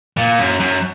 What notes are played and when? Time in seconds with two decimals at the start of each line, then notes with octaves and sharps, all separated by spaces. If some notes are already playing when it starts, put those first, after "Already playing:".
0.17 A#2
0.38 F#2
0.60 F#2